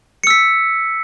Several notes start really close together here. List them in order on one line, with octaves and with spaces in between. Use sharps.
C#7 E6 B6